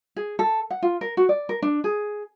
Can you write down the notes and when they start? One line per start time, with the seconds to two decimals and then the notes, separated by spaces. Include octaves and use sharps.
0.16 G#4
0.39 A4
0.71 F#5
0.82 F4
1.01 A#4
1.17 F#4
1.29 D5
1.49 A#4
1.62 D4
1.84 G#4